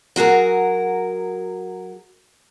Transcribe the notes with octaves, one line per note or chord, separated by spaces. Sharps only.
F#3 F#4 G#4 A#4